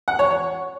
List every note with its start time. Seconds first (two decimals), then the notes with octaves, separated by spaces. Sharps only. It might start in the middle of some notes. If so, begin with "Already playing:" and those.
0.08 F#5
0.19 C#5
0.30 C#5